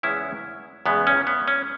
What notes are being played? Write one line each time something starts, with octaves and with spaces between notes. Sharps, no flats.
E2 C#3 G#3 B3 C#4 E4
E2 C#3 G#3 B3
C#4
B3
C#4